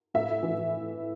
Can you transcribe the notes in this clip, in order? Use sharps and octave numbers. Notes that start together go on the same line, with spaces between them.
A2 E5
E3